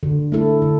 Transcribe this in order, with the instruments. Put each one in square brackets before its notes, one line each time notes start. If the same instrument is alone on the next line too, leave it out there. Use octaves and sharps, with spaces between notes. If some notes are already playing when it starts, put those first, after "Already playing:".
[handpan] D3
A3 E4 A4
D3